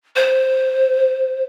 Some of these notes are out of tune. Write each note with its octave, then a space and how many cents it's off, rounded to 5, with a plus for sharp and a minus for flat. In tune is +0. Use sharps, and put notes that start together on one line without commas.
C5 +0